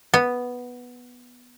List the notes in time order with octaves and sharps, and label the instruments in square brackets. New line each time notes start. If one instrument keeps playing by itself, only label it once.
[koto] B3